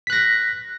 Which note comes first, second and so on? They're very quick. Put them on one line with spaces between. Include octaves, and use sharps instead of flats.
B6 F#6 A#6